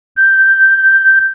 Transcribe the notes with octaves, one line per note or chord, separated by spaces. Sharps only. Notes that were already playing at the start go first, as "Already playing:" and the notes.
G6